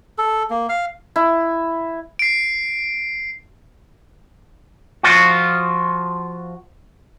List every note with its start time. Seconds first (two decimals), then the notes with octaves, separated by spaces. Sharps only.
0.18 A4
0.50 A#3
0.69 F5
1.16 E4
2.19 C7 D7
5.03 F3 F4 F#4